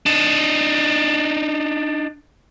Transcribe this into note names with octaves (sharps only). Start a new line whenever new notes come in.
D4 D#4